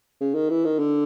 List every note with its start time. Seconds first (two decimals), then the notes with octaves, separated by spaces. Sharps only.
0.21 C#3
0.35 D#3
0.50 E3
0.65 D#3
0.79 D3